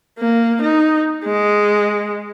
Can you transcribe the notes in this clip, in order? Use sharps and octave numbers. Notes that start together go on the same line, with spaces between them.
A#3
D#4
G#3